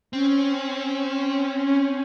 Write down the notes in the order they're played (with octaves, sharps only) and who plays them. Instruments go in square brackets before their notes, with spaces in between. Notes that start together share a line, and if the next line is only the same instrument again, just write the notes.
[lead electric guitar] C4 [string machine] C#4